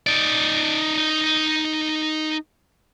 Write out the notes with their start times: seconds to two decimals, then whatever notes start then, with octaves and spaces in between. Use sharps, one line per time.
0.07 D#4 D5